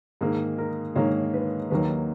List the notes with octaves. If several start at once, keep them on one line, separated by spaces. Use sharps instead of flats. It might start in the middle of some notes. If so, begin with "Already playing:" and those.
G#2 D#3 A#3 G#4
A#4
G#2 D#3 A#3 C#5
B4
D#2 D#3 F#3 A#3 B4